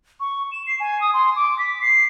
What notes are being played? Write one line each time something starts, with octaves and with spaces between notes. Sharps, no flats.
C#6
E7
C7
G#5
D#6
C6
D6
B6
C7